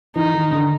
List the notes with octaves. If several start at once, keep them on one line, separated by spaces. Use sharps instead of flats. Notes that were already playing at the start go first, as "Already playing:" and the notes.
E3 D#4
D#3
D3